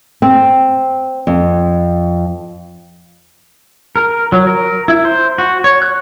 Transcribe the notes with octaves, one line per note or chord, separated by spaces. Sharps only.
C4
F2
A#4
F#3
A#4
E4
C5
F#4
C#5
F#6